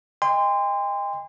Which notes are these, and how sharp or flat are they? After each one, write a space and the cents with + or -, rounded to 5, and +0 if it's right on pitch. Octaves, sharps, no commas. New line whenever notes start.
D#5 +0 G5 +45 C6 -20